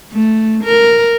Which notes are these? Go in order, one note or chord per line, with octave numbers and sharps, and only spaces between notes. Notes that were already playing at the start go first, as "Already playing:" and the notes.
A3
A#4